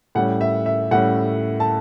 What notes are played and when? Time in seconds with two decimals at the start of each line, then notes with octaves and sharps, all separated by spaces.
0.15 A2 G3 C#4 F#5
0.41 E5
0.66 E5
0.91 A2 G3 C#4 F#5
1.60 A5